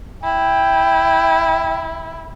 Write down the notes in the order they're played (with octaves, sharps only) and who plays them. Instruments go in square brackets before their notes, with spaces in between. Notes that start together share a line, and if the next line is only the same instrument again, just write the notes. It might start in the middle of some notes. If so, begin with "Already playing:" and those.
[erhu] E4 [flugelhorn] G5